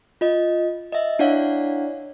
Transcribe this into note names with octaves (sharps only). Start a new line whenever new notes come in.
F4 D#5
D#5 E5
D4 E4 C#5 D5 F5 F#5